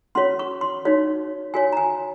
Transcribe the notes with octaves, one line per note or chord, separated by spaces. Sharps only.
C#4 F#4 C#5 C6
C#6
C6
D#4 F#4 C#5
F#4 C#5 G#5
A#5
G#5